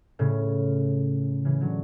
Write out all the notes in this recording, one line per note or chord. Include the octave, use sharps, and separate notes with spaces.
A2 C#3
C#3 E3
D3 F#3